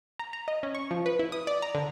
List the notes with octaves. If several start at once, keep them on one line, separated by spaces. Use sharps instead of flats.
A#5
A#5
D#5
C#4
C#6
F3
B4
E4
D#6
D5
A#5
D3